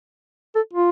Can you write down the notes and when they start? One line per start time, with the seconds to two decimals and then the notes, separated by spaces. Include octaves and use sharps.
0.55 A4
0.73 F4